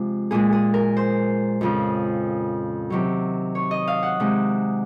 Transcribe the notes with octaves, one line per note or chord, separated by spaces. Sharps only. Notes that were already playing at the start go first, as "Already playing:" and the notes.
Already playing: C3 F3 G#3
A#2 G#3 G#4
G#4
A#4
C5
F2 C#3 F3
C3 D#3 F#3
C#5
D#5
F5
F#5
C3 D#3 G#3